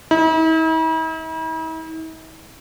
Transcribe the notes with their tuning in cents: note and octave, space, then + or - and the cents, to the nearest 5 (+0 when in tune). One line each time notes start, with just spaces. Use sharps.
E4 -45